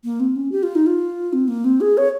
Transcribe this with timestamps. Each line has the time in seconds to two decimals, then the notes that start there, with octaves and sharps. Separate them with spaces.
0.04 A#3
0.20 C4
0.36 C#4
0.52 G4
0.63 F4
0.75 D#4
0.87 F4
1.33 C4
1.48 A#3
1.64 C4
1.81 G#4
1.97 C#5